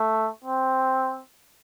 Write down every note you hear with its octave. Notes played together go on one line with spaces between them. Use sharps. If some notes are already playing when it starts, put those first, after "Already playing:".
Already playing: A3
C4